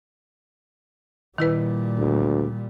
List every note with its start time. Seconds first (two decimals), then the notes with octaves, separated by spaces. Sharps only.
1.38 A#2 D#3 G3 E4 B4
1.98 D2